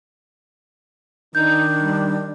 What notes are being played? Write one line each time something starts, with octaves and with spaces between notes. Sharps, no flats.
D#3 D4 D#4 G6
G3